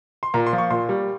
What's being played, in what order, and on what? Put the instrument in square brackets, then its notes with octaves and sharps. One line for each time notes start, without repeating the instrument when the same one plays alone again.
[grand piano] C6
A#2 A#5
C6
F3
C#6
A#2 C6
G3